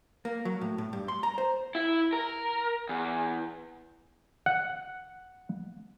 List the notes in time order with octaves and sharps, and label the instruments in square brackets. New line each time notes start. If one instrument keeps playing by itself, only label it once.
[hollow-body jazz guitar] A#3
F#3
A2
A2
G2
C6
A#5
C5
[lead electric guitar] E4
A#4
E2
[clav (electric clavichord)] F#5